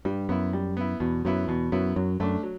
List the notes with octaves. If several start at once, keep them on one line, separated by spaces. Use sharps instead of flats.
G2 G3
F#2 B3 E4
G3
B3 E4
E2 B2
F#2 F#3 B3 E4
E2 B2
F#2 F#3 B3 E4
F#2 F#3
F#2 A3 D4
F#3